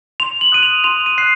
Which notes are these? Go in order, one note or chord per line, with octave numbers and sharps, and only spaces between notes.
C6 F7
F#7
D#6 F#6 D#7
F7
C6 F7
D#7
D#6 F#6 C7